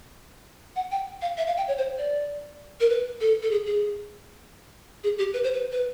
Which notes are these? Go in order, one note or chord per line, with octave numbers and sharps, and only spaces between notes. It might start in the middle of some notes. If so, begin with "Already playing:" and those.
F#5
G5
F5
E5
F5
G5
C#5
C5
D5
A#4
B4
A4
A4
G#4
G#4
G#4
G4
B4
C5
B4
B4